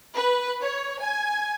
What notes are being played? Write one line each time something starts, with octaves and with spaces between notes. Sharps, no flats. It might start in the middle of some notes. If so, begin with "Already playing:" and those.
B4
C#5
G#5